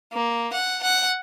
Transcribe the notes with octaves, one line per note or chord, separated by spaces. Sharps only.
A#3
F#5
F#5